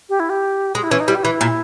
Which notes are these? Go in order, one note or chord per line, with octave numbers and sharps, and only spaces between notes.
G4
E4
G4
G#3 G#4
E4
E3 C#4
D#4
G3 E4
G4
E3 E4
A#2